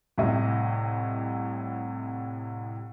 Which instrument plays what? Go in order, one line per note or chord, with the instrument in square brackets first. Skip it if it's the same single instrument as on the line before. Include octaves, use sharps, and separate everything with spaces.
[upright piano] C2 A2 C3 D#5